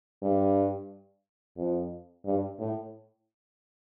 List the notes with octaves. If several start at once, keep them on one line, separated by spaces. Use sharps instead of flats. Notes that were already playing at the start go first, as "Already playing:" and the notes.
G2
F2
G2
A2